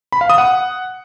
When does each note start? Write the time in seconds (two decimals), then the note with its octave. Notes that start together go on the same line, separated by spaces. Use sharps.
0.12 B5
0.21 F5
0.30 D#6
0.38 F#5